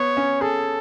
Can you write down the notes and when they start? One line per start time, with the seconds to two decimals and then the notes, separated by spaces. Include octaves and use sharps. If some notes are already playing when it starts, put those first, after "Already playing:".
Already playing: B3 C#5
0.17 C#4
0.41 G#4 A4